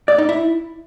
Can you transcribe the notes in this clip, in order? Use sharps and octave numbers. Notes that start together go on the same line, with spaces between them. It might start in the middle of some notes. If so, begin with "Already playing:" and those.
D5
D#4
E4